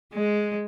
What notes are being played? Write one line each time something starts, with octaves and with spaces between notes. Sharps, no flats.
G#3